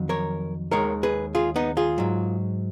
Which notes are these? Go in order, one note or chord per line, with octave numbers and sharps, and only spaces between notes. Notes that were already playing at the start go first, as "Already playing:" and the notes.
Already playing: F2 D#3 F#3
A#4 C#5
D#2 D#3 G#3 A#4 C#5
G#4 B4
F4 G#4
B3 D#4
F4 G#4
G#2 F#3